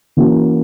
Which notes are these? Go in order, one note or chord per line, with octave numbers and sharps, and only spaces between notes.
E3 A#3 C#4 F#4